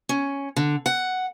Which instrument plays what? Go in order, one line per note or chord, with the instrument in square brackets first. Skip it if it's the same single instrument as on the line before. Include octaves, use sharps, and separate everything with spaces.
[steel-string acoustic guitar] C#4
D3
F#5